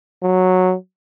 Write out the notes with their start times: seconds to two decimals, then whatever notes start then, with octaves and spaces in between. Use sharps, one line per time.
0.23 F#3